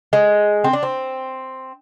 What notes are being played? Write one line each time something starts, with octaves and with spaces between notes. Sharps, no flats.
G#3
C4
D4
C4